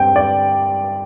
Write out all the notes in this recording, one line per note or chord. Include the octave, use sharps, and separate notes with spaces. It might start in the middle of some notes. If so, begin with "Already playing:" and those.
Already playing: G2 G3 C4 G5
D5